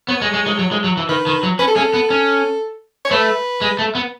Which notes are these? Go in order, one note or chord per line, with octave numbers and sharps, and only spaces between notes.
B3 C#5
G#3
G#3
G#3
F#3
G#3
F#3
E3
D#3 B4
D#3
F#3
C#4 B4
A4
C#4 G#4
A4
B3
C#4
C#5
A3 B4
G#3
A3
B3